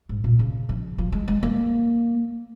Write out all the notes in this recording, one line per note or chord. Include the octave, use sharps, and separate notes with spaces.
G#2
A#2
C#3
F3
F3
G#3
G#3
A#3